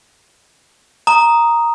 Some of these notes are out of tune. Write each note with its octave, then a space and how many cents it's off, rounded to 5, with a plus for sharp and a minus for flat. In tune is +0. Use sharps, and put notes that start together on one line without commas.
A#5 +0 D#6 +0